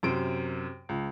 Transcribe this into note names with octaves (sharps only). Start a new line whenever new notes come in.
F#2 C3 C5 D7
C#2